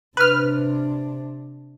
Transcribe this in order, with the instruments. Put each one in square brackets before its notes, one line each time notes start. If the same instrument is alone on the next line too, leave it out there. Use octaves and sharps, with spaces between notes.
[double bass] C3 D4 [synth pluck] B4 F6